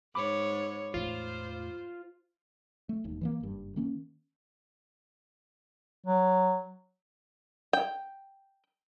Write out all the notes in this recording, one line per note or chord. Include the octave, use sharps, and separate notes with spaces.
G#2 C#5 B5 D6
E2 A2 F4 C5
A3
E1 D#2
E3 F#3 A#3
F#1 G2
D#3 A#3 C#4
F#3
G5